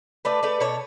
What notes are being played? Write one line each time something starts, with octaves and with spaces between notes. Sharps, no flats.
A3 B4 D5
A3 B4 D5
B2 A4 C#5